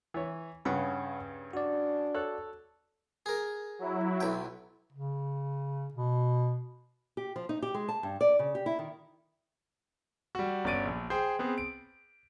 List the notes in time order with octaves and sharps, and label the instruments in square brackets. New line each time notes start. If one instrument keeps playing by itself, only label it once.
[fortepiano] E3 C#5
[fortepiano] G2 C#3 [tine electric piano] C#5 F#5 B5
[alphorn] D4 [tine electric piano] F#4 D5
[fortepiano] A4 C#5 F#6
[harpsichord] G#4 A#4
[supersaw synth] F#3 E4
[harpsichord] B1 G5
[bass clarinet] C#3
B2
[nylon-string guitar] G4
F3
D#4
G4
G#3
A5
G2
D5
C#3
G4
E4
D#3
[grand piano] G3 F#4
G1 C#4 D5 A6 D7 D#7
A#1
G#4 C5 G5
B3 C4 G#4
D7